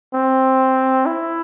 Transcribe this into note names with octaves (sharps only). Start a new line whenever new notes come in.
C4
E4